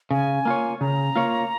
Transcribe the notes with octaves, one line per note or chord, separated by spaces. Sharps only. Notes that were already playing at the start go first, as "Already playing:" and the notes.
C#3 G#5
A#3 F4 C#5
C#3 A#5
A#3 F4 C#5